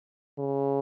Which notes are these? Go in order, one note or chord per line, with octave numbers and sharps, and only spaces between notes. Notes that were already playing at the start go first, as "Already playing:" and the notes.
C#3